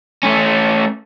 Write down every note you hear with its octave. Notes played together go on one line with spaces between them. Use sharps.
A3 C#4